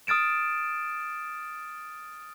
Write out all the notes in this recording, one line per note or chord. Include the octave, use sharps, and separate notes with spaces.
D#6 F6 A6 D7 E7